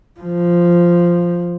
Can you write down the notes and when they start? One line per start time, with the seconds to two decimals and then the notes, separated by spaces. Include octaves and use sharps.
0.20 F3